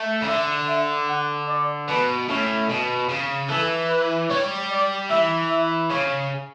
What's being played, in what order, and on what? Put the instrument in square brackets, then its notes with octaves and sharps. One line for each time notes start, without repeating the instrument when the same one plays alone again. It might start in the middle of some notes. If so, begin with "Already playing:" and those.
Already playing: [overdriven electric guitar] A3
C#3
[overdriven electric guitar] D3 [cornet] E5
[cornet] E5
F#5
D5
[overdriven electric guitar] B2 [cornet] B4
[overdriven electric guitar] A2 [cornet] C#4
[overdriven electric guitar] B2
C#3
[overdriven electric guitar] E3 [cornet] A4
[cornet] B4
[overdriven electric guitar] G3 [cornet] C#5
[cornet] D5
[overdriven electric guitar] E3 [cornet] E5
[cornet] E5
[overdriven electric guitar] C#3 [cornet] C#5